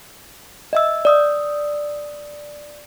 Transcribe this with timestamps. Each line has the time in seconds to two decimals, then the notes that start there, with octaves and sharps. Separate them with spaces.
0.73 D#5 E5 E6
1.05 D5 D#6 E6